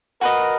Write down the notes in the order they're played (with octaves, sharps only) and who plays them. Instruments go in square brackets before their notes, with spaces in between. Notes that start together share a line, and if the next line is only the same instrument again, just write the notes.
[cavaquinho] F#4 B4 D#5 [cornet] A#4